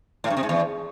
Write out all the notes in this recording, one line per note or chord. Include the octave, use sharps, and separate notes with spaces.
A2
G2
C3
G#2
E2